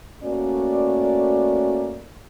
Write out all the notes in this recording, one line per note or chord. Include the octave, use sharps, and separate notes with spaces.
A3 A#3 C#4 F#4 D5